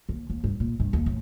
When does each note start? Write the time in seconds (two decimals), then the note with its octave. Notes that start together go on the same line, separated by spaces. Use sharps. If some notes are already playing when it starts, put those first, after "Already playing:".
0.09 D#2
0.30 D#2
0.44 G2
0.60 A#2
0.80 G2
0.93 D#2
1.06 A2